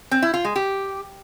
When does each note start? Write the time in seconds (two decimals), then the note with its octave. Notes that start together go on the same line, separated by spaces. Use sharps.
0.11 C4
0.22 E4
0.34 F4
0.45 G#3
0.56 G4